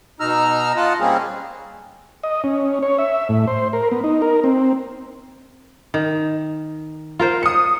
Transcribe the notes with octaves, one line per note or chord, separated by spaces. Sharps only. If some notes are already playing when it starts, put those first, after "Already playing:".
B2 D#4 A#5 E6 F6
F4 D#5 F#5 A5
G3 A#3 C4 C#4 G#4
D#5
C#4
C#5
E5
A2
C5
A#4
B3
D#4
A#4
C4
D#3
F4 A#4 C5
D#6 C#7